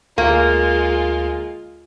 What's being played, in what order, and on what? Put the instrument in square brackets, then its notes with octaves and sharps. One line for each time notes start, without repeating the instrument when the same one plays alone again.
[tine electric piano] D2 [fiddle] G#3 F4 [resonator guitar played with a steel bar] A#3